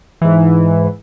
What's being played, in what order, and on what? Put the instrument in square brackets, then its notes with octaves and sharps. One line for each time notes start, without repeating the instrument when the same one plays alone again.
[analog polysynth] G#2 E3